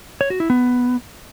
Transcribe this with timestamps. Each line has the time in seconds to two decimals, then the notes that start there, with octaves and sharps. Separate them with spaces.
0.21 C#5
0.30 F#4
0.40 E4
0.50 B3